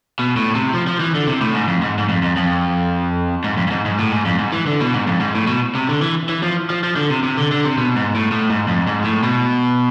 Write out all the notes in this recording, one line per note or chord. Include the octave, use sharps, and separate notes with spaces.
B2
A2
C3
F3
F3
E3
D3
C3
A2
G#2
F2
G#2
G#2
F2
F2
F2
G#2
F2
F2
G#2
G#2
A2
G#2
F2
G#2
E3
D3
B2
G#2
F2
G#2
A2
B2
C3
D3
E3
E3
F3
F3
F3
D3
C3
C3
D3
D3
C3
B2
G#2
A2
A2
G#2
F2
G#2
A2
B2